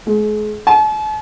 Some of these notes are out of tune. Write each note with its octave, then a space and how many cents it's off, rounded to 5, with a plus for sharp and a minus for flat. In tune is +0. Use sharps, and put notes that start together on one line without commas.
G#3 +35
A5 -45